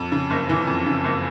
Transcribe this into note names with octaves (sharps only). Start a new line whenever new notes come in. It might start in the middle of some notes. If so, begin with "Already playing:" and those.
Already playing: F2
C#3
F#1
E3
F2
C#3
F#1